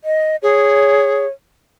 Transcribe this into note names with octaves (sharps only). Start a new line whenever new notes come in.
D#5
G#4 C#5